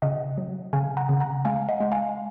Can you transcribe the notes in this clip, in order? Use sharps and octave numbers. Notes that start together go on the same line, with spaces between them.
C#3 D#5 F#5
F#3
C#3 F5 G#5
F#5 A#5
C#3
F#5 A#5
G#3 F5 G#5
D#5 F#5
G#3
F5 G#5